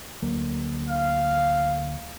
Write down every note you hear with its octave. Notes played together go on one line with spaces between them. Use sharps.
D2 F#3 A#3
F5